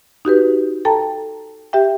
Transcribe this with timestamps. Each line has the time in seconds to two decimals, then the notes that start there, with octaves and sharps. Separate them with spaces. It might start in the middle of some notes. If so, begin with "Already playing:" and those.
0.25 D#4 F#4 G4 B4
0.85 A4 G5 A5 A#5
1.73 G4 E5 G5